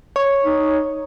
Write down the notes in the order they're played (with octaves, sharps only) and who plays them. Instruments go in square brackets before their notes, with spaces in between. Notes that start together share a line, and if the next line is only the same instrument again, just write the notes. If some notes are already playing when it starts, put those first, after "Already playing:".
[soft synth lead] C#5
[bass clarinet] D#4